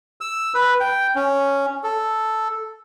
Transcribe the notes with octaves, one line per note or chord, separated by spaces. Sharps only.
E6
B4
G5
C#4
A4